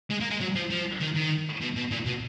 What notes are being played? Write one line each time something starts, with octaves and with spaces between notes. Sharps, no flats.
G#3
A#3
G#3
F#3
F3
F3
D#3
D#3
B2
B2
A#2
B2